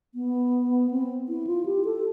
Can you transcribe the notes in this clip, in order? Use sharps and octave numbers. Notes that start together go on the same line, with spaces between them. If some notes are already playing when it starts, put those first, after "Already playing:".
B3
C4
E4
F4
G4
A4